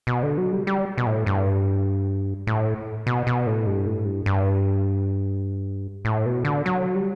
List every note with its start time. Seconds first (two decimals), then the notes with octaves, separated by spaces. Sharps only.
0.07 B2
0.23 D3
0.38 F#3
0.52 G3
0.67 G3
0.97 B2
1.06 A2
1.26 G2
2.47 A2
3.07 B2
3.27 B2
3.47 A2
3.67 G2
3.87 A2
4.05 G2
4.26 G2
6.05 A2
6.26 B2
6.45 D3
6.66 F#3
6.95 G3